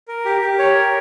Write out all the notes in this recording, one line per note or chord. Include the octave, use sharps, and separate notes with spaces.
A#4
G4
G4
C#5
A#4